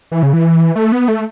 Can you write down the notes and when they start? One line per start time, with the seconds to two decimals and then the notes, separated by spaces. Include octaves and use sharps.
0.12 E3
0.23 C#3
0.33 E3
0.76 A3
0.92 B3
1.08 A3